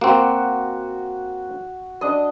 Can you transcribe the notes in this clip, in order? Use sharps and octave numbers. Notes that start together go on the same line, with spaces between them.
A#3 C4 F#4
D4 D#5